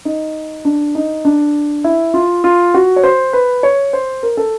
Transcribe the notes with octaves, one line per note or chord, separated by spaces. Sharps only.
D#4
D4
D#4
D4
E4
F4
F4
F#4
C#5
C5
B4
C#5
C5
A#4
A4